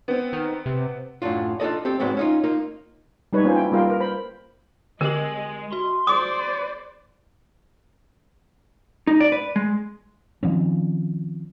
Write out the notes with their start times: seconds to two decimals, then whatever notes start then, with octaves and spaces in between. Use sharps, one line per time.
0.08 B3 C4
0.33 D#3
0.66 C3
1.22 F#2 A2 F#3 D4 F4
1.60 D4 F4 G4 A4 D5 D#5
1.85 C4 G4 A4
2.00 G#2 F#3 G#3 B3 C4
2.17 C#4 D#4 F4
2.44 A#3 D#4 F4
3.33 G3 D#4 B4 C#5
3.44 A#3 C#4 F4 C5 G#5
3.56 E4 G5
3.72 G3 A#3 F4 A#4 F5 G5
3.87 A#4 B4
4.00 C5 B5
5.01 D3 G#3 G4 A#4 D#5 F#7
5.73 F#4 C6
6.07 G#4 C5 D5 D6 D#6
9.07 D#4
9.20 D5
9.32 B4
9.56 G#3
10.43 D#3 F3 C4 C#4